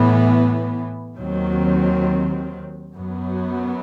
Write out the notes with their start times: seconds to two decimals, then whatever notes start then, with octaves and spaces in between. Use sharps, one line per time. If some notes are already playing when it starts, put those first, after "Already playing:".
Already playing: A2 E3 B3
1.17 D#2 D#3 F#3 C4
2.94 F#2 F#3 B3